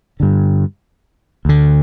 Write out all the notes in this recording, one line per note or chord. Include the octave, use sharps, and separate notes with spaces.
G2 D3
D2 D3